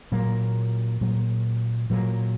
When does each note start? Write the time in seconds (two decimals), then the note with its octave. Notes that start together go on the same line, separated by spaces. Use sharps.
0.12 A#2 F#3 A#3
1.01 A#2 F#3 A#3
1.90 A#2 F#3 A#3